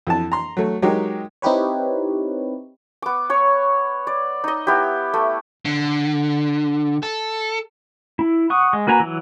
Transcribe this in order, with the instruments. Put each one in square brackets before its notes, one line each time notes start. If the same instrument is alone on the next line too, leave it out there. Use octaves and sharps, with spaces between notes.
[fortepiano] F2 E3 A5
A#5 C6
F#3 A3
F#3 G#3 D#4 G4 A#4
[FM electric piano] C4 D#4 E4 G4 B4 C#5
[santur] B3 D6
C#5 C#6
D5
D#4 D#5
B3 E4 G4
A3
[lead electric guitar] D3
A4
[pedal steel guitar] E4
F#5 C#6 D#6
G#3
A#3 F#4 B4 G#5 A#5
E3 F#3